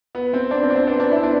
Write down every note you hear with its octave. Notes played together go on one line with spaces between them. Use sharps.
B3
C4
B3 D4
C4
D4
C4
B3 D4
B3 D4
C4 E4
B3 D4